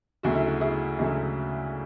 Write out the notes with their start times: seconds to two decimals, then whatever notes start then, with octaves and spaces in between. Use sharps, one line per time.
0.23 D2 C#3 F#3 A3 F#4
0.35 E4
0.47 F#4
0.61 E4 G#4
0.98 D2 C#3 F#3 A3